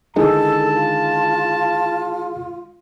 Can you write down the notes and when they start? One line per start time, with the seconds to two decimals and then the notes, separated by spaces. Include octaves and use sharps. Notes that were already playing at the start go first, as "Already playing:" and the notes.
0.16 D3 D#3 G#3 E4 G#4 A4 A5
0.74 F4